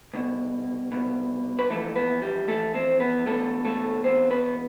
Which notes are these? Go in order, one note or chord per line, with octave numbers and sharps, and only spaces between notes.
C2 B2
C2 B2
B4
F2 E3 A3 A4
B3 B4
G3 G4
F2 E3 A3 A4
C4 C5
B3 B4
E2 B2 A3 A4
A3 A4
E2 B2 C4 C5
B3 B4